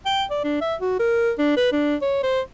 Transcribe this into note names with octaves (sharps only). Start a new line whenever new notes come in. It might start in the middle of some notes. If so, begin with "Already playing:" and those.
G5
D5
D4
E5
F#4
A#4
D4
B4
D4
C#5
C5